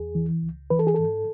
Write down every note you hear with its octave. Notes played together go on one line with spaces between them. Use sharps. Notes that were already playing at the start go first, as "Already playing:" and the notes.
Already playing: E2 G#4
E3
C#2
E3 B4
A4
G#4
G#2 A4